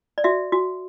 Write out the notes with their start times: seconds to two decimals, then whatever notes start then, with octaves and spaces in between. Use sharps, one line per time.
0.18 D5
0.24 F#4 E5
0.52 F#4